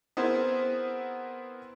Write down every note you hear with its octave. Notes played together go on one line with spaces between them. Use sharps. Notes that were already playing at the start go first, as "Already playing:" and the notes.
B3 C4 E4 G#4 A#4 C5